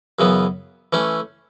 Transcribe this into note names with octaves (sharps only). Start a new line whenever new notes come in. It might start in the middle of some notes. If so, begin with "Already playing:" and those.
F#2 C#3 E3 B3
E3 A3 C#4